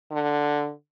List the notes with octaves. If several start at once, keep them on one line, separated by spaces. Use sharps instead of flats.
D3